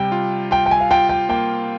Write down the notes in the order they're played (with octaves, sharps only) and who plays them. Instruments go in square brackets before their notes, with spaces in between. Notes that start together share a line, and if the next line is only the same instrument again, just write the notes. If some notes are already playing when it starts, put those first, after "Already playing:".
Already playing: [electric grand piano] C3 G3 [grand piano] G5
[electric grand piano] F4
[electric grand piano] F4 [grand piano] G5
[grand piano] G5
G#5
F5
[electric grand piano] F4 [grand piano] G5
[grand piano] G5
[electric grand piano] A#3 [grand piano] G5